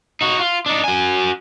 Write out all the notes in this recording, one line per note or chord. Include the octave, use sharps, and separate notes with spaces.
D#4 F#4
F4
D4 D#4
F#4 G#5